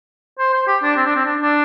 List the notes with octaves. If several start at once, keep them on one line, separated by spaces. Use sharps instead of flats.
C5
C5
G4
D4
C4
D4
C4
D4
D4